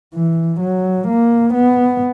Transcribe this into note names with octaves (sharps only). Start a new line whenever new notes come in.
E3
F#3
A#3
B3